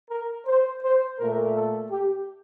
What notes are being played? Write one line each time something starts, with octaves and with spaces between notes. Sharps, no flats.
A#4
C5
C5
A#2 A3 A#4
A4
G4